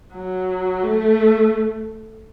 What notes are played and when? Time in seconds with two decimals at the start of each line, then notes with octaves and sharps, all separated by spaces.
0.15 F#3
0.83 A3